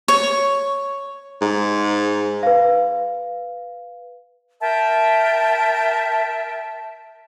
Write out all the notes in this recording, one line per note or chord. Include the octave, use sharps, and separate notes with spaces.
C#5
G#2
B4 F5
A#4 E5 G5 A5